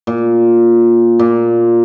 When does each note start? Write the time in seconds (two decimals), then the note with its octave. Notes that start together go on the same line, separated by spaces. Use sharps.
0.07 A#2
1.19 A#2